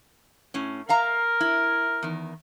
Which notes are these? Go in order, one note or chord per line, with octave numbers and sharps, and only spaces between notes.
A2 C#4
A#4 E5 F5 A#5
E4
E2 D#3